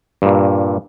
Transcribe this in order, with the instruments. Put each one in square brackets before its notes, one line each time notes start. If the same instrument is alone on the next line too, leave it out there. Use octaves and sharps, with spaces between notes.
[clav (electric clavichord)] G2 A#2